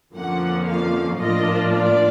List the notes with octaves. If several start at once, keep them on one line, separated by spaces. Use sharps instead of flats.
F2 D3 F3 A#3 C#4 F#5
F5
A2 F3 A#3 D4 F4 D#5
D5